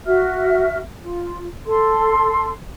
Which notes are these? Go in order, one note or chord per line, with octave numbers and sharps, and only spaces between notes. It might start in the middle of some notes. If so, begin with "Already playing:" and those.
F#4 E5 F6
F4
A4 C6